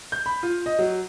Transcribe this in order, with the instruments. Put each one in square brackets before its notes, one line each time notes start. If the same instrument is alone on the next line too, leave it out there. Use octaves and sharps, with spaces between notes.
[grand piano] G6
B5
F4
D#5
F#3